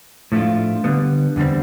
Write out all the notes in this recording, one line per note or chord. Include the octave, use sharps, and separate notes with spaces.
A2 F3 A3 D4 F4
D3 G3 B3
E2 D3 G3 C4